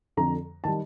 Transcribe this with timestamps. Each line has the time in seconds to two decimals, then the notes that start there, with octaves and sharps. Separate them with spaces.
0.17 F2 D3 F3 A#5
0.64 D#3 G3 A5